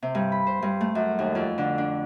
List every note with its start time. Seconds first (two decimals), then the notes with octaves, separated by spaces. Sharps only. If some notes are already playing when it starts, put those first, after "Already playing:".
0.02 C3
0.15 G2
0.32 B5
0.47 C5
0.62 G2
0.81 A3
0.95 F#2
1.19 D#2
1.35 F2
1.58 D3
1.78 D4